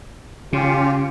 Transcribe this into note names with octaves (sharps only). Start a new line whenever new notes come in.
C#3 C#4 F4 G4